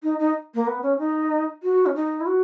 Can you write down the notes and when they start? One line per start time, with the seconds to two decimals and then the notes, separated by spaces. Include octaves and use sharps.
0.03 D#4
0.19 D#4
0.55 A#3
0.67 B3
0.83 C#4
0.99 D#4
1.63 F#4
1.86 C#4
1.95 D#4
2.20 E4
2.26 F#4